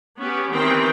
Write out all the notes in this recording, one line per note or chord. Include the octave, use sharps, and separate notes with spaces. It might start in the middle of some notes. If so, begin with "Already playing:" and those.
B3 C#4 G4
D#3 E3 C4 G5